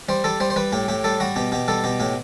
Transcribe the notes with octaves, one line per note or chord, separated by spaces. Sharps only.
G3 C5
G3 A4
G3 C5
C5
G3 B4
A2 G4
A2 G4
G3 A4
G3 F#4
B2 G4
B2 G4
G3 A4
B2 G4
A2 G4